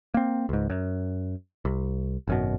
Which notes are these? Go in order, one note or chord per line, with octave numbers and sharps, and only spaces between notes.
A#3 C4
C#2 G#2
F#2
C2
G#1 F#2 B2